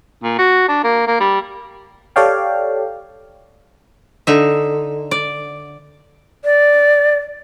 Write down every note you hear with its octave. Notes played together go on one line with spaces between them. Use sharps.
A#2
F#4
D4
A#3
A#3
G3
G4 A4 C#5 D5 F5 G5
D3 D#4 E5
D5
D5